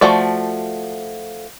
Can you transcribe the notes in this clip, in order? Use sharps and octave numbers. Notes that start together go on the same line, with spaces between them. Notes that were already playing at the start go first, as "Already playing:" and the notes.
F3 A3 F#4 D5